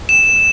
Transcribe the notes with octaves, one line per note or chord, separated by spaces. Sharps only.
E7